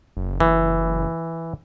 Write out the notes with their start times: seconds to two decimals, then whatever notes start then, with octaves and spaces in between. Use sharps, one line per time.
0.17 F#1
0.40 E3